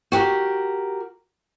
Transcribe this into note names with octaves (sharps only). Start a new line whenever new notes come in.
F#4 G4 A#4